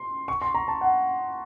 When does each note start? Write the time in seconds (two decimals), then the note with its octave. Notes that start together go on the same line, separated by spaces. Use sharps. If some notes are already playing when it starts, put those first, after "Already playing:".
Already playing: C6
0.28 C#6
0.42 C6
0.54 A#5
0.68 A5
0.81 F#5